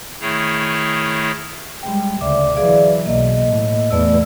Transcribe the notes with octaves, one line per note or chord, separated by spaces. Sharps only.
D#3 A3 E4 G#4 C#5
G3 G#3 G5
D2 C#3 D5 E5 D6
E3 F#3 G#4 D5 F5
B1 A#3 D#5
A2
E2 E3 A3 D5 E6